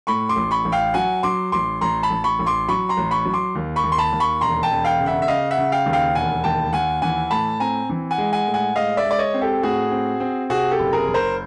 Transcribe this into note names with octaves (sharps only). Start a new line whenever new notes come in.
A2 B5 C#6
C6 D6
A1
B5 C#6
A1
F5 G5
F#3 F#5 G#5
F#3 C6 D6
A1 C6 D6
A1 A#5 C6
A5 B5
A1
B5 C#6
A1
C6 D6
F#3 B5 C#6
A#5 C6
A1
B5 C#6
F#3
C6 D6
D#2
B5 C#6
D#2
C6
A5 B5
D#2
B5 C#6
E1 A#5 C6
G5 A5
E1
F5 G5
C#3
E5 F#5
E5
C#3 D#5 F5
E5 F#5
C#3
F5 G5
D#2
F5 G5
E1 F#5 G#5
D#2 G5 A5
D#2 F#5 G#5
E3 F#5 G#5
A2 A5 B5
C4 G#5 A#5
E3
F#5 G#5
G#3
F#5 G#5
A2
F#5 G#5
G#3 D#5 F5
D5 E5
G#3
D5
C#5 D#5
C4
G4 A4
A2 F#4 G#4
C4
C4
C3 F#4 G#4
G4 A4
F#1
G#4 A#4
F#1
A#4 C5